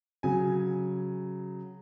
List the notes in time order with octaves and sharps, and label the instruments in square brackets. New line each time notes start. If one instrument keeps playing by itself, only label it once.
[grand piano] C#3 F#3 G#5